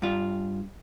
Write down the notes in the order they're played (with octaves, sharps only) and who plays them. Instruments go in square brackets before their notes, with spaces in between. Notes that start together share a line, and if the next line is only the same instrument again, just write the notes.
[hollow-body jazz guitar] G2 F4